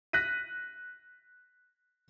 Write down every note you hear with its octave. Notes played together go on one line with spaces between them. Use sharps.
F#6 A#6 B6 D#7